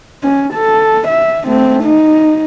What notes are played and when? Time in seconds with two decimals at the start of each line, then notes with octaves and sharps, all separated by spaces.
0.23 C#4
0.54 A4
1.08 E5
1.46 A3 C4
1.84 D#4